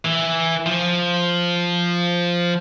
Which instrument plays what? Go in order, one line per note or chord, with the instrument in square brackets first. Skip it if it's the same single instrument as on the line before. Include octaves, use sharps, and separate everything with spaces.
[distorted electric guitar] E3
F3